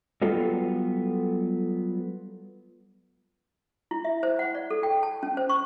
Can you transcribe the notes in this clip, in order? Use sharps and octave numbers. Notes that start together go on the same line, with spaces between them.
F#3 G3 B3 F4 A4
E4
E5
C5
F#5
D5
A4
G5
A5
C#4
C5
C#6